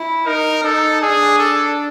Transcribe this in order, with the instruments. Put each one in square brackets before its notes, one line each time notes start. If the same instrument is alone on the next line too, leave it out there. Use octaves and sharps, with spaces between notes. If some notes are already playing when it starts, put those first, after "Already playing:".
Already playing: [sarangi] E4
[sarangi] D#4 [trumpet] A#4
[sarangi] D#4 [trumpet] A4
[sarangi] D4 [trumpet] G#4
[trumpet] A4